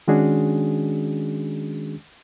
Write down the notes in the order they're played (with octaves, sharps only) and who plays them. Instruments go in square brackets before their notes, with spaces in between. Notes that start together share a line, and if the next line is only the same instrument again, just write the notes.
[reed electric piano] D#3 G#3 C#4 D4 F#4 G#4